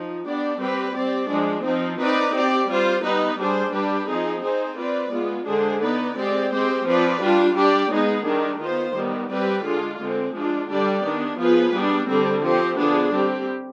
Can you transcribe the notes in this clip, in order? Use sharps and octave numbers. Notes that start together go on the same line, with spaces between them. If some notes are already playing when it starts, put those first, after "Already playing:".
Already playing: F3 D#4
B3 D4 G4 D5
G3 C4 G4 B4
C4 G4 D5
F3 G#3 D4
F3 C4 D#4
C4 D#4 B4 D5
C4 G4 D5
G3 C4 F4 C5
G3 B3 D#4 B4
G3 D4 G#4 C5
G3 D4 G4 B4
F3 C4 D#4 G#4
C4 D#4 G#4 C5
C4 F4 B4 D5
G#3 B3 F4
D3 G#3 D4 G#4 C5
B3 D#4 B4 D5
G#3 C4 G4 D5
G#3 C4 G4 C5
F3 C4 F4 B4 D5
G3 D4 F4
G3 D4 G4 D5
G#3 B3 D#4 G#4
D#3 G3 D4
D#3 B3 F4 C5
D#3 G3 B3
G3 C4 G4 B4 D5
D3 G#3 D4 F4
D3 G#3 C4
F3 G#3 D4 F4
D3 G3 D4 G4 D5
D#3 B3 D4
F3 B3 F4 G#4 B4
G3 B3 D4
D3 G3 C4
F3 C4 G4 C5
D3 F3 B3 D4 G#4
G3 C4 G4